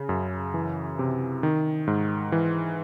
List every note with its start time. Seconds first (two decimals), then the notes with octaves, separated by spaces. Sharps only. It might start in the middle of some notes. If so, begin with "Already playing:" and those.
Already playing: C#3
0.09 F#2
0.54 E3
0.99 C3
1.43 D#3
1.87 G#2
2.32 E3